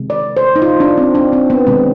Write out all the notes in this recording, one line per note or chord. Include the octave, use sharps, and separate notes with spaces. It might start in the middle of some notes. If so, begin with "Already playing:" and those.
Already playing: C3 D#3 G#3
D5
C5
D#4
F4
D4
C4
D4
C4
B3
C3 D#3 G#3 C4